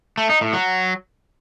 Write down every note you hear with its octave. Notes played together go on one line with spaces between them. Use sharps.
A3
D#4
A2
F#3